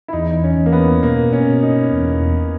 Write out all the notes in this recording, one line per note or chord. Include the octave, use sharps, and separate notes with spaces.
E4
E2 D#4
C#4
E2
A#3
B3
B2 A#3
C#4
B2
D#4
E2